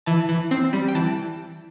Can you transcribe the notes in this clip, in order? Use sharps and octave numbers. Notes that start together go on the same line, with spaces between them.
E3 A5
E3
C4
G3
G5
E3 A5